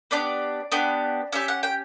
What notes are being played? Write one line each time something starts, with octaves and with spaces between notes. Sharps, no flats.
B3 D4 G4 D5
B3 D4 G4
C#4 G4 E5
F#5
G5